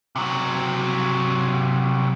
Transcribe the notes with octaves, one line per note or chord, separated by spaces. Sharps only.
C3 F#3